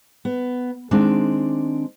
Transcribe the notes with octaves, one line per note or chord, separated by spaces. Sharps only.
B3
D#3 G#3 C4 D4 D5